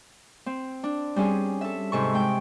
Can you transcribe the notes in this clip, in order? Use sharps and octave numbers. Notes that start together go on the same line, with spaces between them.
C4
D4
G3 C4 C#4 G#4
A4 E5
G#2 C3 A4 C#6
G#3 G5